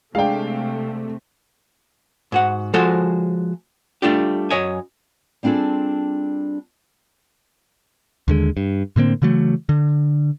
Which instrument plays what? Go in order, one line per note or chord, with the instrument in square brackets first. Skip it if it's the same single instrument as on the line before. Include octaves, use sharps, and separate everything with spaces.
[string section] C3 A3 [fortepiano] G#3 D4 [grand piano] F5 G5
[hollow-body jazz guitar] G#2 F#4 F#5
F3 G#3 F#4 A4 C5
G3 A3 D4 F4 G4
F#2 C#5 D#5 G#5
[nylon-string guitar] G3 C4 D4 F4 G#4 A4
[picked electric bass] D#2 D3 G#3
G2
A2 D3 A#3 C4
C#3 E3 F#3 A3
D3